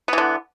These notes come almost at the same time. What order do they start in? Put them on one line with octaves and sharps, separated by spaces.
B3 E3 D3